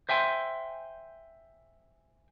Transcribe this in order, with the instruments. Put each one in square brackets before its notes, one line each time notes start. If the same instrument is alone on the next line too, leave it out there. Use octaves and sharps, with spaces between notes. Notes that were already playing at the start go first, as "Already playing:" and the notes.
[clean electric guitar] C5 E5 G5 G#5 C6